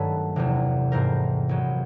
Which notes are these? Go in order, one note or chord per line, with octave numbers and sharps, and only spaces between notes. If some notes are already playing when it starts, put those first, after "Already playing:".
Already playing: G2 D#3 F#3 A3 C#4 A4 B4
F1 E2 C3 E3
G#2 E3 A3 C4 A#4 C5
A#1 A#2 F#3